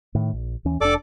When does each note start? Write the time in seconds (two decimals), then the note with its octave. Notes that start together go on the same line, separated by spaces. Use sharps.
0.15 A2 D#3
0.33 A#1
0.65 D#2 E3 C#4
0.81 F1 D4 A4 D5 D6